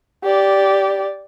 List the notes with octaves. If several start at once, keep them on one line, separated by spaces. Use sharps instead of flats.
G4 D5